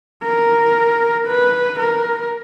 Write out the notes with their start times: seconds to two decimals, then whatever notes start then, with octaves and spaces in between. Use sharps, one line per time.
0.24 A#4
1.28 B4
1.80 A#4